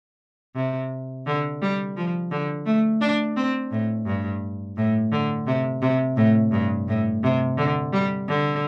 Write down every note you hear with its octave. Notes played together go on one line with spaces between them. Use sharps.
C3
D3
G3
F3
D3
A3
D4
C4
A2
G2
A2
D3
C3
C3
A2
G2
A2
C3
D3
G3
D3